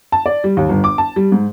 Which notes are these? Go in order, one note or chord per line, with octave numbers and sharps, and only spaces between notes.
A5
D5
G3
D#2
G1
D6
A5
G3
G#2